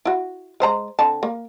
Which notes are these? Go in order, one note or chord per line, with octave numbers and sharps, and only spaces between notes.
E4 F#4
G#3 C5 A#5
D3 C4 A5
A#3